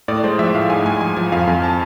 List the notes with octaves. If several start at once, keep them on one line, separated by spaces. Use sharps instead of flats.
A2 D5
G#3 C5
F3 E5
A2 F5
G#2 G#5
G#3 G#5
F3 G#5
F3 G#5
F2 F5
F2 G#5
A5